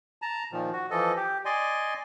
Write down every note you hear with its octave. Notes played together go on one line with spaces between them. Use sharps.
A5 A#5
A#2 D#3 F3
F#4
E3 F3 A4 D#5
G4
D5 D#5 G#5 C6